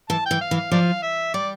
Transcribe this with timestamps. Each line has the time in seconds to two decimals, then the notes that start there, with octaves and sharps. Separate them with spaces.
0.10 E3 A5
0.26 E3 G5
0.41 F5
0.51 E3
0.57 F5
0.71 F3 D5 F5
1.03 E5
1.34 G3 D5